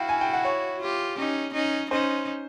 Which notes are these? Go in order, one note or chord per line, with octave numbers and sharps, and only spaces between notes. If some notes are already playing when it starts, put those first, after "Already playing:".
Already playing: E4 F#4 F5 G5
G#5
G5
F#5
C#5
F4 G4
C#4 D#4
C#4 D#4
C#4 D#4 C5